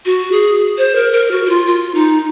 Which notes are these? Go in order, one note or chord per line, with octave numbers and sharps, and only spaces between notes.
F#4
G#4
C5
A#4
A#4
F#4
F#4
F4
F4
D#4